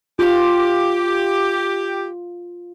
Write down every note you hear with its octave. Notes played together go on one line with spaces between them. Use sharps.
F4 G4